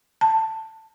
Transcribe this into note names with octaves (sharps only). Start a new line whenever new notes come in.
A5